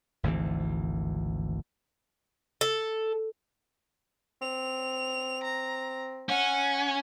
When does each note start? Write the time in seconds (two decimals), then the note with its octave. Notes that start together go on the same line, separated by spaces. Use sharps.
0.23 G#1 D2 C3 E3
2.61 A4
4.42 C4 F7
5.44 A#5
6.29 C#4 F#5